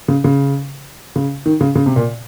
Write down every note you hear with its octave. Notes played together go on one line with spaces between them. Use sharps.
C#3
C#3
C#3
D#3
C#3
C#3
C3
A#2